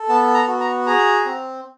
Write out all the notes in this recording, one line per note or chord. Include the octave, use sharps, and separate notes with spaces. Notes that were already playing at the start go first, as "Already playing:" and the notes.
Already playing: A4
B3 A5
A#5
F#4
A#5
G#4 A#5
C4